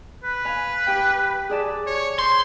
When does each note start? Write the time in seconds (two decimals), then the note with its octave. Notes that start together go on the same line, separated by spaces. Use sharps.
0.24 B4
0.45 F5 G#5 B5
0.87 G4 G5
1.49 G#4 D5 A5
1.87 C#5
2.19 C5 C6